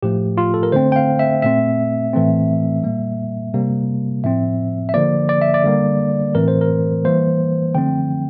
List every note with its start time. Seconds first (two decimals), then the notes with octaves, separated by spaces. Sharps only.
0.03 A2 F3 A3 G4
0.38 F4
0.54 A4
0.63 A#4
0.72 D3 A3 C4 C5
0.92 G5
0.96 F5
1.19 E5
1.42 A#2 A3 C4 E5
2.13 A2 E3 A3 C4
2.84 A#2 G3 A#3
3.54 C3 G3 A#3
4.24 A2 F3 C4 E5
4.89 E5
4.94 D3 F3 A#3 D5
5.29 D5
5.41 E5
5.54 D5
5.64 D3 G3 A#3
6.35 A2 E3 A3 C4 A#4
6.48 C5
6.61 A#4
7.05 E3 G3 A#3 C5
7.75 D3 F3 A3 C4 G5